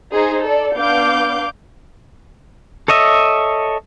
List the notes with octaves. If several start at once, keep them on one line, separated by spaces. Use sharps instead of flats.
D#4 G#4 C5
A4 D5
B3 D4 F5 D6 G6 D7
A4 C#5 D#5 E5